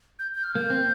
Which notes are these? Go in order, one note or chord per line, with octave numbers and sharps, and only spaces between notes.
G6
G6
F6
A#3 G6
C4